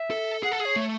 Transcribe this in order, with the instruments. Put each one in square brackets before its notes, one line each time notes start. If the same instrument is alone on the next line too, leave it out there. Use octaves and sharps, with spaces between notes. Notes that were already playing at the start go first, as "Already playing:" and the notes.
Already playing: [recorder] E5
[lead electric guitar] A4
[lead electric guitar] G#4 [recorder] F#5
[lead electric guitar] A4
G#4
[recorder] C#5
[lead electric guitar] A3